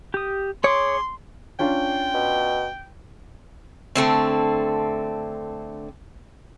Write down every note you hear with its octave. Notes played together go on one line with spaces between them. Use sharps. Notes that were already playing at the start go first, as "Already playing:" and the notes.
G4 D#6
G#4 C#5 C6 D6
C#4 D4 F4 G5
B2
D3 A3 C4